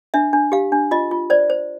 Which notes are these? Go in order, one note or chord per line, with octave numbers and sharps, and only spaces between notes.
D4 E5
D4
G4 F5
D4
F4 D#5
F4
C5 D5
C5